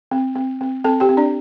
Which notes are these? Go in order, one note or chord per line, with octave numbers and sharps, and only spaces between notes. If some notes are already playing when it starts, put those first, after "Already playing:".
C4
C4
C4
C4 A4 A5
G4 G5
C4
D4 D5